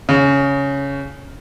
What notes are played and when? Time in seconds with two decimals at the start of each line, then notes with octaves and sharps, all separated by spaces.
0.09 C#3